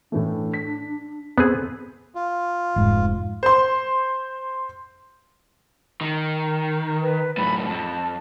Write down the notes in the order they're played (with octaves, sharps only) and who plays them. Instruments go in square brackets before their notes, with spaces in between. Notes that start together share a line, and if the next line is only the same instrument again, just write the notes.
[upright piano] A2 E3 A3 [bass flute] D4
[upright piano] B6
[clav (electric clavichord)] B3 C4 G#4 [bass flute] A4
[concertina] F4
[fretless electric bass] F1 G#2
[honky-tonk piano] C5 C6
[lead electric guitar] D#3
[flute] B4
[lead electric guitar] F#2 A2 [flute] B5
[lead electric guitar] F2 [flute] A5